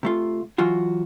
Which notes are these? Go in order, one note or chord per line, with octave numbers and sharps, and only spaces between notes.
C3 A3 F4
E3 F#3 F4 F#4